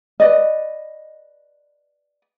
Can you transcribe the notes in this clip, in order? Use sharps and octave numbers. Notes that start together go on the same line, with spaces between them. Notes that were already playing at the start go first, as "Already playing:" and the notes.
B4 D5 D#5